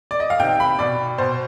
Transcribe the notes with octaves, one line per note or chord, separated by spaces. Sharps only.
D5
D#5
F5
C3 D#3 G5
B5
B2 D5
B2 C5